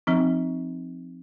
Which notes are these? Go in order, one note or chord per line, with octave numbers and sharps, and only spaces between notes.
F3 C4 D#4